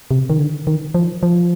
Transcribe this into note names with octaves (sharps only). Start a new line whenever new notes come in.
C3
D#3
D3
D#3
F3
F3